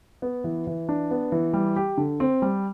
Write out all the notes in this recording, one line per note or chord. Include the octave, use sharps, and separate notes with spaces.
B3
E3
E3
D4
B3
E3
G3
G4
D3
C4
G3